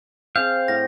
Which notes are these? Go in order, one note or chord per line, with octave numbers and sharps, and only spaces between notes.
C4 G#4 F5 G6
A2 F#5 A#6